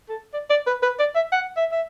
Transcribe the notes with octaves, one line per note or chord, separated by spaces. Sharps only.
A4
D5
D5
B4
B4
D5
E5
F#5
E5
E5